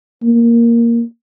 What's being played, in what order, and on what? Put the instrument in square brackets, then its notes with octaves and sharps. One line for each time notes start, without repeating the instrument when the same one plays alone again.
[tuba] A#3